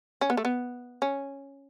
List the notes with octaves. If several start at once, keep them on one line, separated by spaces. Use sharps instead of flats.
C#4
B3
A3
B3
C#4